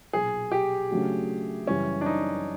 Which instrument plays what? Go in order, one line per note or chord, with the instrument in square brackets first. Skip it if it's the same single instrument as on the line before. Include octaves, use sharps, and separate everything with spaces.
[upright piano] B1 A#2 F#3 [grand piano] G#4
[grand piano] G4
[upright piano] C#3 F#3 A3 D4 F#4
[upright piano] F#2 C#3 E3 G3 [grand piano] C#4
[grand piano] D4
D#4